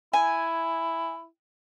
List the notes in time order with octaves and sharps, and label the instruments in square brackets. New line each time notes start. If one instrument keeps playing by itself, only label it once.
[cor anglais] E4 [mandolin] G#5